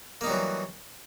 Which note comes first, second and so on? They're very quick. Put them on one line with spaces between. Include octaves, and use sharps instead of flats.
A#3 D#4 G3 F#3 E3